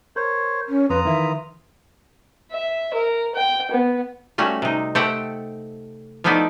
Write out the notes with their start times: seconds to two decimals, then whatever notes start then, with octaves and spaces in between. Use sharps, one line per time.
0.16 A#4 C5 C#5
0.69 C#4
0.90 F2 F4 B4 A#5 D#6
1.05 D#3 E3 B4 E5
2.51 E5
2.94 A#4
3.35 G5
3.71 B3
4.38 G3 A3 C#4 F#4
4.62 C3 D#4
4.95 A3 C4 G4 A4 F#5 G5
6.24 F3 A3 B3 D#4 E4 D5